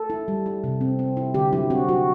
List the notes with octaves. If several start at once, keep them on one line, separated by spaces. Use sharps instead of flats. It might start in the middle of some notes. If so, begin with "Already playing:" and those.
Already playing: A4
E4
G3
E4
C3
C4
C4
E4
D3 G4
F#3 E4
C4 F#4
F#3 F#4